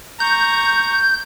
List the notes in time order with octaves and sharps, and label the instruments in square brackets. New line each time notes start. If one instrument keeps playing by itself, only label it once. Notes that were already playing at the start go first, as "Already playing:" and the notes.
[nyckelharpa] A#5 C#6 [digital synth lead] G6